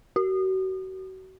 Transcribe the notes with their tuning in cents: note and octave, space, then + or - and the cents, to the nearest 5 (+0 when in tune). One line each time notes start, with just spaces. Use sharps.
F#4 +35